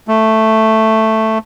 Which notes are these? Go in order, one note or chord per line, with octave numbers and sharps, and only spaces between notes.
A3